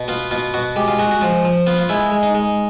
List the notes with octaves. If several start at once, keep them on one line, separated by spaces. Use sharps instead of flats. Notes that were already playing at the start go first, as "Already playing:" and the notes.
Already playing: B2
B3 F4
B2 F4
B2 F#4
G#3 G4
F4
G#3 F#4
F#4
F3 F4
F3
B3 F4
F4
G#3 E4
G#3
D#4
G#3